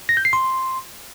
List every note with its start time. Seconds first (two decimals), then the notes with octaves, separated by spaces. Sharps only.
0.09 A#6
0.17 G6
0.25 C7
0.33 C6